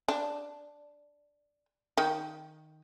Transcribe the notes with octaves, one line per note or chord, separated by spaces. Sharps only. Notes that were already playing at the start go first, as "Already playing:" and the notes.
D4
D#3